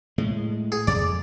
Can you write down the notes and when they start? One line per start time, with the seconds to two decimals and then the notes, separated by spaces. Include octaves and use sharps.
0.18 A2 G#3
0.72 G#4
0.87 F2 D5